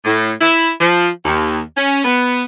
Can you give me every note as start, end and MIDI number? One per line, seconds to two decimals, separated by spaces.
0.05 0.32 45
0.41 0.71 64
0.81 1.09 53
1.25 1.60 39
1.77 2.02 61
2.05 2.43 59